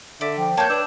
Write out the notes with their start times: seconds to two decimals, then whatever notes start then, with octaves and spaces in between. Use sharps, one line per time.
0.21 D3 D5 E5
0.38 F3 G5
0.57 A#3 C#5 A5 G6
0.70 D4 B4 E6